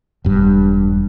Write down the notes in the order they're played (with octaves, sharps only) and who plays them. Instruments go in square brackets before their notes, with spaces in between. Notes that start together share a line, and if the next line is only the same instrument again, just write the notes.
[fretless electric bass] E1 G2